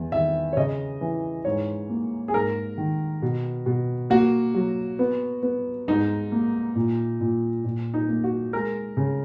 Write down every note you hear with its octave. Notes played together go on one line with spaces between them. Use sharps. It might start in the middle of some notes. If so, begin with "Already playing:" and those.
Already playing: E2
D#3 E5
C#5
C#3 D#5
E3
G#2 C#5
A#3
G#4
G#2 A#4
D#3
B2
B2
A#3 F#4
F#3
B3
B3
G#2 D#4
A#3
A#2
A#2
A#2
D#4
A#3
F#4
G#3 A#4
C#3